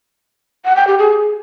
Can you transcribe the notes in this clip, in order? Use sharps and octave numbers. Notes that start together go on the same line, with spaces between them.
F#5
G5
G4
G#4